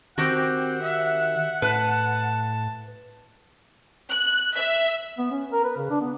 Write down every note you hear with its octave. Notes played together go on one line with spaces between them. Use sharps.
D#3 C4 F#4 G4 F#5
E5
A2 B4 A5
F#6
E5
B3
C#4
A#4
B4
C#3
D4
B3